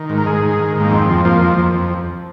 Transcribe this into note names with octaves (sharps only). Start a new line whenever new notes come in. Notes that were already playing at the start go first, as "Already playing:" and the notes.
Already playing: D#3
G#2
A#4
G#2 G#4
D#3
D#3
G#2 A#3
F2 C4
F3
F3 A#3
F2
F2